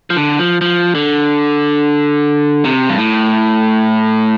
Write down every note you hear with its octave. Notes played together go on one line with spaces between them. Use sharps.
F3
D3
F3
F3
D3
C3
G2
A2